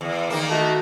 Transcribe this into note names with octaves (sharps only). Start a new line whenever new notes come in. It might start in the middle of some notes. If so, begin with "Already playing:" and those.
E2
D#3 A#3
A3 D#4 F#4